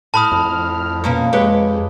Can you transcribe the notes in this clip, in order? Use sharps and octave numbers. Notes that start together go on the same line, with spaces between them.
A2 A5 B5 D#6 F6
F2
B2 A#3 C#4
G#3 G4 B4 C#5